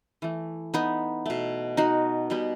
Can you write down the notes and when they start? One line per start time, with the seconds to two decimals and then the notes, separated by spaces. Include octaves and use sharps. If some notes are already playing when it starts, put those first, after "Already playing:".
0.22 E3 A3
0.74 B3 D#4
1.26 B2 A3
1.77 D#4 F#4
2.30 B2 G3 B3